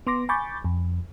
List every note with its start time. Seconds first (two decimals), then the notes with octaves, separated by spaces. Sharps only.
0.07 B3 C6 D6 A#6
0.29 G#5 B5 C#6 D6 G6 A6
0.64 F2